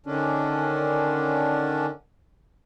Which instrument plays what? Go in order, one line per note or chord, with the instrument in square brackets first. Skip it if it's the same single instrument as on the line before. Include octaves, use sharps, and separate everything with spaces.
[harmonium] D3 D#3 C#4 D4